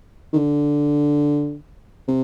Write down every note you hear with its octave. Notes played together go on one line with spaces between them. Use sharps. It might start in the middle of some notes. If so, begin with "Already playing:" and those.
D#3
D3
C3